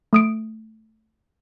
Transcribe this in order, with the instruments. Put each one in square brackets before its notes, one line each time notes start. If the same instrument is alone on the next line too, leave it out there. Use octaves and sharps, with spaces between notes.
[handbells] A3 D#6 D7